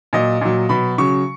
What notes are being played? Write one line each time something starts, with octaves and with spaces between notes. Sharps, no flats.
A#2 F#3 D#5
A#2 F#3
B2 F#3 B5
C#3 F#3 C#6